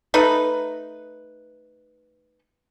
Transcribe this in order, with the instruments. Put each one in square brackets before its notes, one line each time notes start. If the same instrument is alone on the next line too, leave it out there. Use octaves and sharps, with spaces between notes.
[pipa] A3 D#4 B4